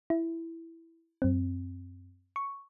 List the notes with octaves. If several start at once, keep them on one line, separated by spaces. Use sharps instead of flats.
E4
F#2 C4
C#6